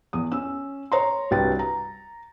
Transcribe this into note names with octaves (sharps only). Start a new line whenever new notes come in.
E2 D#6
C#4 E6
C#5 A#5 C6
C2 G2 F#4 B4 G5 A6
A#5